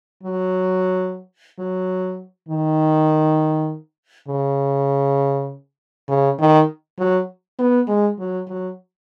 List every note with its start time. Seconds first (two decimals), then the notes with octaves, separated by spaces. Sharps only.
0.23 F#3
1.59 F#3
2.48 D#3
4.28 C#3
6.08 C#3
6.39 D#3
6.98 F#3
7.59 B3
7.88 G#3
8.19 F#3
8.48 F#3